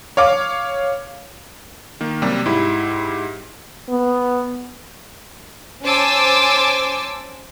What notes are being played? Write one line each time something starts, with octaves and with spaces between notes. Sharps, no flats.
C#5 F5 D6
D#3 A#3
F#2 C3 G3 A#3
G#2 E4 G4 B5
B3
C#4 C5 G#5 A5 D6 E6